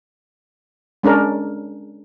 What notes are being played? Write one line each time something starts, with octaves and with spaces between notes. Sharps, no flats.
G#3 C#4 D4 A#4